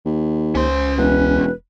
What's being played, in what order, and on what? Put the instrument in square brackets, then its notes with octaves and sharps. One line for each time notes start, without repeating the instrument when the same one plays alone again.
[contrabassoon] D#2
[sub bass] C#2 [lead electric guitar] C#4 C6 [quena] C5
[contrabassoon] E1 [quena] B4